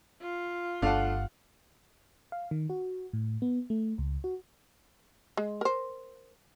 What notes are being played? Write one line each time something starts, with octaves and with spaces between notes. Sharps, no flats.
F4
G1 A3 D4 F5 F#5
F5
D#3
F#4
A2
B3
A3
C#2
F#4
G#3
A#4 C5